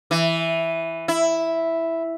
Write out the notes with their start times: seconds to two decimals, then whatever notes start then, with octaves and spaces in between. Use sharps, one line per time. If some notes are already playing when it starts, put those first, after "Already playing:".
0.11 E3
1.08 E4